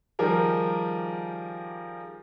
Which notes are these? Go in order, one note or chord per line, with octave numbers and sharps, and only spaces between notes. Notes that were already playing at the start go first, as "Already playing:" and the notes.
D#3 F3 G3 G4 G#4 A#4